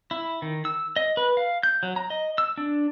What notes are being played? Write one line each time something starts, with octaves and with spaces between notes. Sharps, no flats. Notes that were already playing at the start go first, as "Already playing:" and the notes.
E4
D#3
E6
D#5
B4
F5
G6
F#3
A#5
D#5
E6
D4